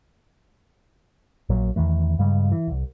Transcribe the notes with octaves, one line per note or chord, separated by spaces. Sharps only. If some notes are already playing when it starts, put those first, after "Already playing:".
A#1 A#2 F#3
E2 D#3 E3 A3
G2 C#3 G3 G#3
E3
D1 C2